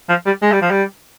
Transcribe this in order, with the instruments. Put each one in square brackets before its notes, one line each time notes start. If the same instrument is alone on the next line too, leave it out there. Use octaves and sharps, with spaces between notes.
[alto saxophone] F3
G3
G#3
G3
F3
G3